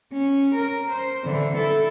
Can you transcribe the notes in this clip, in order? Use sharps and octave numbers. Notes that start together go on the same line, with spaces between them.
C#4
A#4
C5
D3 E3
E4 A4